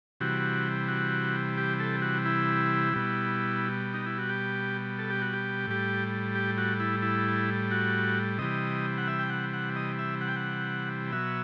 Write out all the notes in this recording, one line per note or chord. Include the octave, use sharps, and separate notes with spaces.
C3 E3 G3 F#4
F#4
G4
A4
F#4
E4
B2 G3
D#4
E4
F#4
G4
A4
G4
F#4
G4
A2 G3
G4
F#4
E4
E4
F#4
C3 E3 G3 D#5
F#5
E5
G5
F#5
F#5
D#5
E5
F#5
G5
F#5
B2 F#3 E5